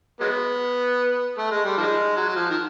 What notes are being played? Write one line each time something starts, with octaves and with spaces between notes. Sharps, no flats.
F#3 G#3 B3
A3
G#3
G3
D#3 F3 G#3
F#3
F#3
F3
D#3